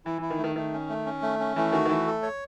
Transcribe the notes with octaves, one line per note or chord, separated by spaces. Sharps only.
E3 E4
E3 E4
D#3
A3
D#3
D#3 A3
C#4
A3
C#4
A3
C#4
E3 A3
D#3 F#4
D#3
E3 A3
A4
C#5